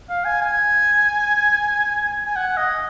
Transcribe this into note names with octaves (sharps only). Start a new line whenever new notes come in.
F5
G#5
G#5
G#5
F#5
D#5